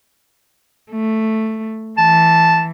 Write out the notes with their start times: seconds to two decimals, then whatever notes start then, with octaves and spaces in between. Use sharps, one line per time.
0.90 A3
1.98 E3 A5